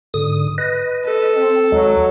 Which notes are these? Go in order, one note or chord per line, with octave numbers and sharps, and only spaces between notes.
G#2 D3 D#6
B4 D#5
A4
C4
D#2 F#3 G#3